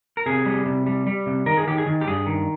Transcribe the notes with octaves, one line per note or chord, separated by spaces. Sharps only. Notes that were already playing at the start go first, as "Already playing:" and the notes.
A#4
C3 G#4
G3
C3
G3
G3
C3
D#3 A#4
G#4
D#3 G4
G#4
D#3
G4
G2 G#4
D#3